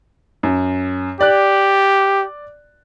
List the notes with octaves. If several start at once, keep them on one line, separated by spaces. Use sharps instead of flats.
F#2
G4 D5 F#6